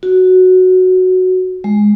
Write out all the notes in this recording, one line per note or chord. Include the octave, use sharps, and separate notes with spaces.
F#4
G#3